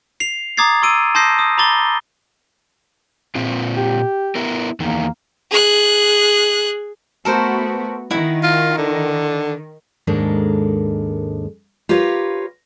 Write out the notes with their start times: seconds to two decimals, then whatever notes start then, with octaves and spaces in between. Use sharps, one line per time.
0.20 C7 F7
0.57 A#5 D6 D#6 G#6 A6 C7
0.82 C6 E6 D7 D#7
1.15 A5 C6 D#6 G6 A#6 C7
1.39 D#6
1.58 A#5 B5 D6 A6 G7
3.35 A#2 C4 F4
3.77 G4
4.35 B3 E4 A#4
4.80 E2 D#3 A#3
5.51 G#4 F#6
7.25 A3 B3 F#4 A4 A#4 C5
8.11 D#3 E4 F#5
8.43 F4
8.78 D3
10.07 D#2 G#2 G#3 D4 A4 A#4
11.89 F4 G4 A#4 B4 C#5 F5